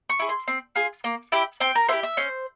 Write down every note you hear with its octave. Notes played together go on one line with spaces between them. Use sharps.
C#6
E4 G#4
C6
C4
F4 G#4
A#3
E4 G4
C4 G5
A#4
E4 G4 C5
E5
C#4 C5